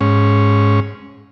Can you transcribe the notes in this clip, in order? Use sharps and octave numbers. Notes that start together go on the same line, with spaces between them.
G#2 C#4